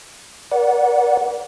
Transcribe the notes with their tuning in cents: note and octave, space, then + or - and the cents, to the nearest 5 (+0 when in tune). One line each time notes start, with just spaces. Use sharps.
A#4 +45 D5 -20 F#5 -10